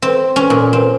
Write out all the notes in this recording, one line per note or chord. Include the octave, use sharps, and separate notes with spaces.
C4
C#4
A#2
C4